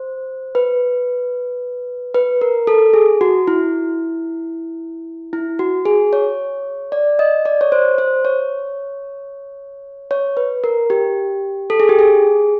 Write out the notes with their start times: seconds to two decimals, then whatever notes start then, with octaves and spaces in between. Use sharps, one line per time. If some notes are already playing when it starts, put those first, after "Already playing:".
Already playing: C5
0.55 B4
2.15 B4
2.41 A#4
2.67 A4
2.93 G#4
3.21 F#4
3.47 E4
5.33 E4
5.59 F#4
5.86 G#4
6.13 C#5
6.92 D5
7.19 D#5
7.46 D5
7.61 C#5
7.72 C5
7.98 C5
8.25 C#5
10.11 C#5
10.37 B4
10.64 A#4
10.90 G4
11.70 A4
11.80 G#4
11.89 G4
11.99 G#4